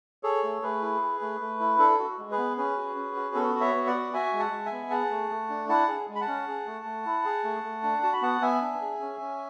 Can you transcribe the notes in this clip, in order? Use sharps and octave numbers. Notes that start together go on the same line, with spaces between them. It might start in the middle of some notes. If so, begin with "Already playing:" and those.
G#4 A4 C#5
A3
A3 G#4 B4
E4
G#4
A3
A3
E4
D4 A4
F#4
G#3
G#4 B4
B3
C#4 G#4 B4
F#4
C#4
F#4
B3 A4
F#4
C#5 E5
B3
D5 F#5
F#4
F#4 E5 G#5
G#3
F#5 A5
G#3
E5 G#5
B3
G#4 F#5 A5
A3
A3
D4
E4 F#5 A5
G#4
G#3
B5
F#5 A5
C#4
G#4
A3
A3
E4
G#4
A3
A3
D4
F#4 A5
B5
B3 F#5 A5
B3 E5 G#5
D4
G#4
C#4
C#4